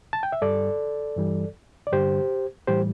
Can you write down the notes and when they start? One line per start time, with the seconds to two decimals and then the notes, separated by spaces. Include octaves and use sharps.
0.13 A5
0.23 G5
0.32 E5
0.42 G2 G3 A4 D5
1.17 G2 E3 G3
1.87 D5
1.92 G2 D3 G3 G4 C5
2.68 A2 E3 G3 G4 C5